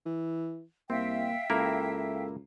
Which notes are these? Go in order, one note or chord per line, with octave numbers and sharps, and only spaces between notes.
E3
C2 A#3 C4 E5 F5 G5
C#2 A#3 E4 A4 A#4 E6